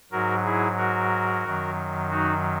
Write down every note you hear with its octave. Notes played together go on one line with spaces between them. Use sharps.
G#2 F#3 F#4 A#4
E4 G#4
F#4 A#4
F#2 D#3 F#3
D#4 F#4